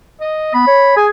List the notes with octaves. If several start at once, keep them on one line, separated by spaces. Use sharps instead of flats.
D#5
B3 B5
C#5
G#4 G#5